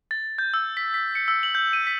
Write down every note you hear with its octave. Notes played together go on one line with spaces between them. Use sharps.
A6
G6
E6
B6
B6
C#7
E6
F#7
G6
D#7
B6